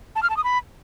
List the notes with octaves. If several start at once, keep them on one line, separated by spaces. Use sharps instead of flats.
A5
F6
A5
D#6
B5